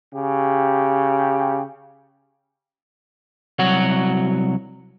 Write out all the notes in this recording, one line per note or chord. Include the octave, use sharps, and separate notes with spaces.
C#3 G4
C2 F#3 F#4 C#5 F#5